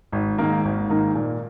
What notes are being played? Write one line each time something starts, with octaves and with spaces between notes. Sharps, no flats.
G#1
G#2 D#3 A#3
G#1
G#2 D#3 A#3
A#2